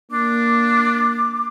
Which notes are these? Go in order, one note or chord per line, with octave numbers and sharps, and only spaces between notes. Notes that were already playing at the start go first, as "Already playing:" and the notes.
A#3 D4 D6